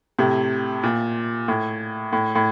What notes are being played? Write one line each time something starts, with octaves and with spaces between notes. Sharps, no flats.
A2 C3
A#2
A2
A2
A2